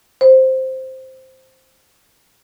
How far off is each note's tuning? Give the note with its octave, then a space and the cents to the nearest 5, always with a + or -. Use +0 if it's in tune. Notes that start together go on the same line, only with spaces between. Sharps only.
C5 +0